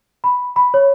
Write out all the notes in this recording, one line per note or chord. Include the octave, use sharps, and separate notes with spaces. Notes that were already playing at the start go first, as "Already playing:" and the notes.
B5
B5
C#5